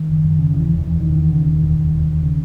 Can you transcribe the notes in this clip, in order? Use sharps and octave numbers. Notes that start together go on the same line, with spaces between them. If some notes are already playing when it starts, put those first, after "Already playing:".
Already playing: D#3
F#1
F#2
C#3
E1 E3
E1
E3
E1
E1 D#3
E2
C#3
E1
E1
E1
E1
E1
C#3